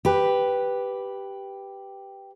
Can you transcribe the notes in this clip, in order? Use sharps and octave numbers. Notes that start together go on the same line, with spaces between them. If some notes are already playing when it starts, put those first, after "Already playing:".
G4 B4